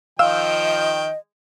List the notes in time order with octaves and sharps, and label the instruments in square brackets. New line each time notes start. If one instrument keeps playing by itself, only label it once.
[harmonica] D#3 F3 G5 [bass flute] D#5 [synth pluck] F5 E6